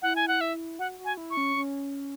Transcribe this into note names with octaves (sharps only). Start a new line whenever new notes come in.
E4 F#5
G#5
F#5
E5
F#4 F#5
F#4
G#5
E4
C#6
C#4
C#4